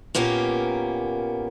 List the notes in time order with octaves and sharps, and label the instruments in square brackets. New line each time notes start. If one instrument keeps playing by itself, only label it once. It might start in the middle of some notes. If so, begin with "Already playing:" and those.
[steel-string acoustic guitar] A#2 A#3 B3 C#4 G4